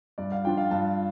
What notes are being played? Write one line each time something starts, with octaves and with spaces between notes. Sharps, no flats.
G2 D5
F5
F3 D4 F4 G5
F5
G2 A5